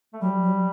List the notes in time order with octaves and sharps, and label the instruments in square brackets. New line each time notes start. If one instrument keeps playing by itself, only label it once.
[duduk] A3
[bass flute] F#3 [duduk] G3
[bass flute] F#3